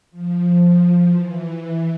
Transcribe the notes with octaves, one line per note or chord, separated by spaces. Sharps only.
F3
E3